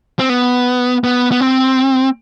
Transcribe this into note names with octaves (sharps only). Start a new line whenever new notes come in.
C4
B3
B3
B3
C4